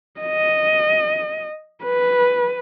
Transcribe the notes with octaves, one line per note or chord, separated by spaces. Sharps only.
D#5
B4